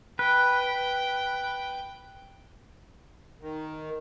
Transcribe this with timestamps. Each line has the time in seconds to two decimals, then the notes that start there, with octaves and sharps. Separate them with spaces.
0.19 B4 G5
3.41 D#3